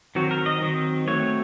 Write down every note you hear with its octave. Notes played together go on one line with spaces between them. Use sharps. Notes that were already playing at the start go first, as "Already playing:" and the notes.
D#3 F#3 C4 F#4
A#4
D#5
D#3 F#3 C4
F#3 A3 C4 C#5